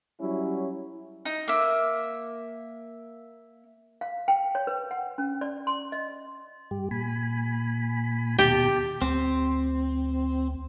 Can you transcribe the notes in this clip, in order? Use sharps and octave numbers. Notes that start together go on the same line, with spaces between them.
F#3 G3 C#4 E4
D#4
A#3 E5
F5
G5
C#5
B4
F#5
C#4
D5
C6
D#5
G2 G4
A#2 G#5 B5
D#2 B2 G4 A5
D2 C4